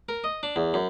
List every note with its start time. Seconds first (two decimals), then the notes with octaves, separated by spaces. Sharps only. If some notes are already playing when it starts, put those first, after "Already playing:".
0.09 A#4
0.24 D#5
0.43 D4
0.56 E2
0.74 F#2